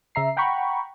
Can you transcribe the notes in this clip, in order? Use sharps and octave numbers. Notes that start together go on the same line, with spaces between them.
C#3 E5 A#5 C7
F#5 G5 A#5 B5 C#6